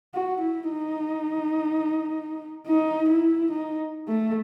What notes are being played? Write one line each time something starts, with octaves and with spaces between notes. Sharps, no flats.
F#4
E4
D#4
D#4
E4
D#4
A3